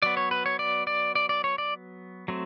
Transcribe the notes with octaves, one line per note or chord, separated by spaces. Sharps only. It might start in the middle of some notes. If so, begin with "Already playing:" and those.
F#3 B3 D5
C#5
B4
C#5
D5
D5
D5
D5
C#5
D5
F#3 A3 C4